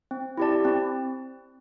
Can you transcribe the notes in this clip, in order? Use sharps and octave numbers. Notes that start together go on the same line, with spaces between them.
C4
E4 G4 D5 A5
C4